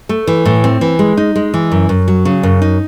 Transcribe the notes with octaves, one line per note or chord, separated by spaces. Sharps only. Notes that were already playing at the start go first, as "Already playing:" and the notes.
A3
E3
A2
C4
E3
G#3
D#4
G#3
E3
F#2
F#2
F#3
C#3
F#2
D#4